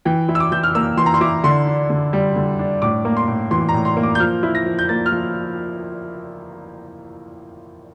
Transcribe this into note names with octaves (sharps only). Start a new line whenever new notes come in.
E3 G5
E4
E6
D6
E3 G6
F6
A#3 E6
E3 C6
A#5
C6
E4 D6
D3 C6
D4
D3
G3
D3
D4
A2 D6
A#3
C6
A2
E3 C6
A#5
A2
C6
A#3
D6
G6
F3 F6
E4
A#6
F3
G6
A#3 A6
F6
F3